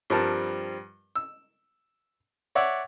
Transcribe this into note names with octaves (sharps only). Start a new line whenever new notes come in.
G2 F3 G3 C4 A#4 A5
E6
C#5 D5 E5 F#5